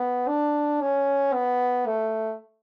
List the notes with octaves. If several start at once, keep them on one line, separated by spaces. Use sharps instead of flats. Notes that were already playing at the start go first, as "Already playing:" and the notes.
Already playing: B3
D4
C#4
B3
A3